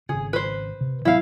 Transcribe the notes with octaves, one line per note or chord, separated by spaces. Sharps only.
G#1 C#3 G#4
B4 C5
C3
A1 F#3 B3 E4 F5